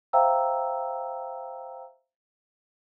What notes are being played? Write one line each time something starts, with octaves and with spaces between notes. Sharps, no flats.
C5 E5 F5 G5 A#5 E6